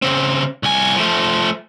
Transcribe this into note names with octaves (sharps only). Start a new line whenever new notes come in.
C#3 C4
C2 G#5
F3 A3